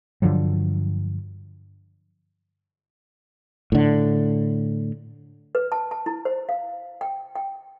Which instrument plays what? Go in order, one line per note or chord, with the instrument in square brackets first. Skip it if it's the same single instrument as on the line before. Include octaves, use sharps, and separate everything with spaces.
[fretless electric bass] G2 D3 F3 F#3
A2 D3
[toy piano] B4
A5
A5
E4
C5
F5
G5
G5